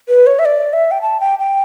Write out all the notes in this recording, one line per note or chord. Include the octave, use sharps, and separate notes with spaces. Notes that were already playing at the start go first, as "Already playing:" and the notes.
B4
C#5
E5
D5
E5
G5
A5
G5
G5